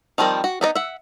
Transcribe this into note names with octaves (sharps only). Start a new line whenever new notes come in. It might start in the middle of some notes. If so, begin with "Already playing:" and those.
D#3 F3 G3 C4 A#4
F#4
B3 D#4 D5 D#5
E5 F#5